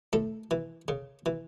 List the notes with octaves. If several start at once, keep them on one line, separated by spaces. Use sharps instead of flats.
A2 A4
E3
C#3
E3